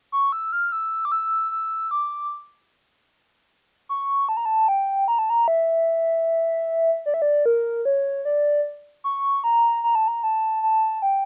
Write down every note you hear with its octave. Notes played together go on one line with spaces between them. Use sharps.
C#6
E6
F6
E6
D6
E6
E6
D6
C#6
A5
A#5
A5
G5
A#5
A5
A#5
E5
D5
E5
D5
A#4
C#5
D5
C#6
A#5
A#5
A5
A#5
A5
A5
G5